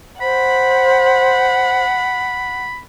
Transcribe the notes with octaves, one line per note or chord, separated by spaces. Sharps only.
C5 F#5 B5